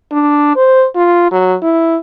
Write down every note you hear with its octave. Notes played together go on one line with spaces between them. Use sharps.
D4
C5
F4
F#3
E4